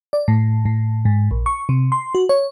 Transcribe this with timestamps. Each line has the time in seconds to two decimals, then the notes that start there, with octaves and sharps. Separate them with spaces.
0.13 D5
0.28 A2
0.65 A2
1.05 G#2
1.31 A#1
1.46 C#6
1.69 C3
1.92 C6
2.15 F#4
2.29 C#5